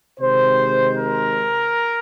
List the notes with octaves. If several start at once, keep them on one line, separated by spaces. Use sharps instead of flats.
C3 D#3 G#3 C5
A#4